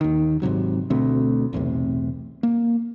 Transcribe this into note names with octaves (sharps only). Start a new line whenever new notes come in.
D#2 D#3
G#1 G#2 C3 F#3
D2 B2 A3 C4
B1 E2 A2 C3
A#3